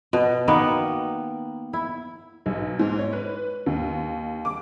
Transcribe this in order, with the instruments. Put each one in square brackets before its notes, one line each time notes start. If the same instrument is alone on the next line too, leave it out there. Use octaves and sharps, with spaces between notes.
[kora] B2
D#3 A#3 B3
E4
[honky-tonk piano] B1
G#2
C#5
B4
D#2
D6